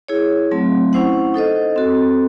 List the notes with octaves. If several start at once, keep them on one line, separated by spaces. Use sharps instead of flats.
E4 G#4 C#5
F#3 A3 C4
C#4 E4 C5 F#5
D#4 A4 C5 D#5
C4 F#4 A4